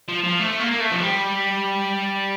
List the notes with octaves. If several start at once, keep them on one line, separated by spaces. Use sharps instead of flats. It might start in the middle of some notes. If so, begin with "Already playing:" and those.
F3
F3
A3
A#3
A#3
A3
F3
G3